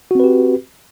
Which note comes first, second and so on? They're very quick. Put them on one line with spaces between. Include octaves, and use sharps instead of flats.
F#4 C4 B4 G4